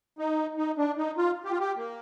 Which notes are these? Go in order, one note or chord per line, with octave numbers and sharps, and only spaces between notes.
D#4
D#4
D4
D#4
F4
G4
F4
G4
A#3